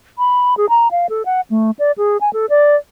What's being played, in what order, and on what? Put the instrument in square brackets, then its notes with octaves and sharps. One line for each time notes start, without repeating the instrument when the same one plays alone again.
[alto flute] B5
G#4
A#5
F5
A4
F#5
A3
D5
G#4
G#5
A4
D5